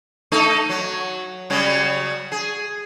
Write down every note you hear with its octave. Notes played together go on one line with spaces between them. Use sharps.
A3 D#4 A4
F#3
C#3 F#3 G3
G#4